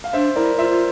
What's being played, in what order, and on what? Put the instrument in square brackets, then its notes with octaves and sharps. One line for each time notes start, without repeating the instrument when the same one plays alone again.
[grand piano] F5
[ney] D4 [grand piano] C5 E5
[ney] E4 [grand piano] A#4 D5
[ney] F4 [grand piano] C5 E5
[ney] F4